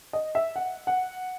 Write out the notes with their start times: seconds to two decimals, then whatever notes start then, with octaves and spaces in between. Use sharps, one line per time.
0.13 D#5
0.35 E5
0.56 F#5
0.87 F#5